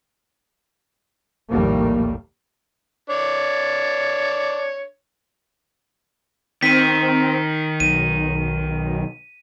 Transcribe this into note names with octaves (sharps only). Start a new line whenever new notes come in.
A#1 D#2 A2 G3 A3 A#3
D4 C#5
D#3 C4 B6 D#7
B1 D#7